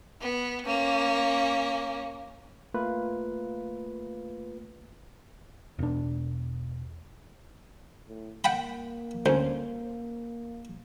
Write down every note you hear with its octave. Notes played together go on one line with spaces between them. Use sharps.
B3
A#3 C#4
A3 A#3 F4 B4
E1 D4
A2
A#3 F#5 G5 B5
D2 C#4 C5